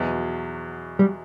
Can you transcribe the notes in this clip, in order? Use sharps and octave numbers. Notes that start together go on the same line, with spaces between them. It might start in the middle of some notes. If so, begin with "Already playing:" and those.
Already playing: E2 B2 F#3
G3